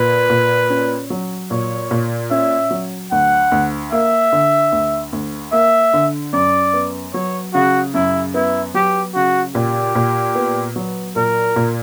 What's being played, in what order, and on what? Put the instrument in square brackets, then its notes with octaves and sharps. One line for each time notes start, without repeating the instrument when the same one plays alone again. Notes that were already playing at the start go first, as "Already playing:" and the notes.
Already playing: [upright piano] A#2 [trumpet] B4
[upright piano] A#2
C#4
F#3
[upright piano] A#2 [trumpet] C#5
[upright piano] A#2
[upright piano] C#4 [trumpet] E5
[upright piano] F#3
[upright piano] D2 [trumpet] F#5
[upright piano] D2
[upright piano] A#3 [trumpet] E5
[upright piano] D3
D2
D2
[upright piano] A#3 [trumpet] E5
[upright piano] D3
[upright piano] F#2 [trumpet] D5
[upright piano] B3
[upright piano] F#3 [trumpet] C#5
[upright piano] C#3 [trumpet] F#4
[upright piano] F#2 [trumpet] E4
[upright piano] B3 [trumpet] E4
[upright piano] F#3 [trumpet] G4
[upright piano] C#3 [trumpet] F#4
[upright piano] A#2 [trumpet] G4
[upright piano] A#2
B3
F#3
[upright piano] A#2 [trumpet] A#4
[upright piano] A#2